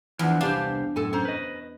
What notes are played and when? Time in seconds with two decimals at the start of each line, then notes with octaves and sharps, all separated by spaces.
0.19 E2 E3 F3 D4
0.41 C2 B3 D4 G4 C5 F5
0.96 F#2 A2 A4 G#5
1.13 C#4 C5 A#5
1.25 B4 D#5